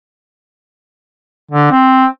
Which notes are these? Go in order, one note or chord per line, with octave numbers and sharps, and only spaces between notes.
D3
C4